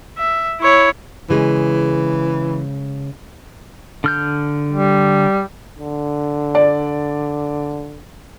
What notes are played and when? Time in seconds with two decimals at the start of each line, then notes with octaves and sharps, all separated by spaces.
0.18 E5
0.60 E4 C#5
1.30 C#3 E3 G#3 G#4
4.04 D3 F6 G6
4.72 G3
5.79 D3
6.55 D5